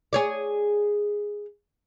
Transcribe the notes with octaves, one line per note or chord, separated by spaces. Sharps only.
G#4 C#5 D5